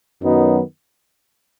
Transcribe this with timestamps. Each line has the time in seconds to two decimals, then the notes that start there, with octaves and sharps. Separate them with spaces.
0.22 F#2 D#3 F#3 B3 D#4